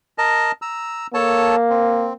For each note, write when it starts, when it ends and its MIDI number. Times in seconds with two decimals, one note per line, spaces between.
0.18 0.52 70
0.18 0.52 75
0.18 0.52 81
0.62 1.07 82
0.62 1.07 88
1.14 2.13 58
1.14 1.56 69
1.14 1.56 73
1.14 1.56 81
1.70 2.13 60